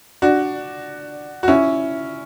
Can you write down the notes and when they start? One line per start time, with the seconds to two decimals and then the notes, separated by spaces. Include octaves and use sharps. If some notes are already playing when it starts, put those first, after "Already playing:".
0.22 D4 F#4
1.43 F#4
1.48 C#4 E4